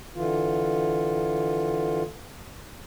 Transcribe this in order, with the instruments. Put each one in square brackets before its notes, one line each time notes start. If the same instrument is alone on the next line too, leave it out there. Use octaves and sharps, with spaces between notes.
[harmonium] D3 E3 F4